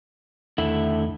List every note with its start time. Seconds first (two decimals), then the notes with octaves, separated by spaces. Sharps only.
0.58 E2 D3 D#3 A3 E4